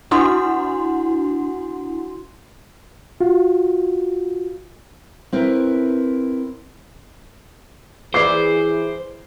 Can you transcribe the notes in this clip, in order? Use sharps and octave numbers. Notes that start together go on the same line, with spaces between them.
D4 E4 F#4 F#5 C6
F4 F#4
C4 E4 A#4 B4
E3 E4 G#4 B4 C5 D5 D6 C7